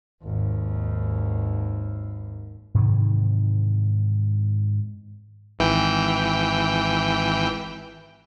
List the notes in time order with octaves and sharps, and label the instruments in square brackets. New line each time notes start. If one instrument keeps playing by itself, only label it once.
[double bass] G#1 D#2
[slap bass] G#2 C3 D#3 E3
[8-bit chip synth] G#1 E3 G5